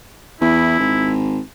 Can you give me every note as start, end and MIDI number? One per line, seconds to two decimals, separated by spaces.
0.41 0.75 40
0.41 1.12 64
0.79 1.40 32